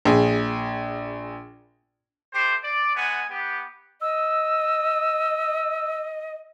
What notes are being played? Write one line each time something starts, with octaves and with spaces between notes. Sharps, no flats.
A#1 G#4
A3 G4 C5
D5
G#3 B3 F#5 G#5
B3 G4
D#5 E6